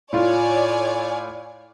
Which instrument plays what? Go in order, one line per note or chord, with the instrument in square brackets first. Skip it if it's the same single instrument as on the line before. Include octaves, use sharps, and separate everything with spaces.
[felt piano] A2 F4 [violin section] C#5 D5 G#5